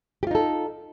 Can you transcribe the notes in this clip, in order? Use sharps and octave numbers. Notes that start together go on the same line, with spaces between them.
D#4 F4 G4 A4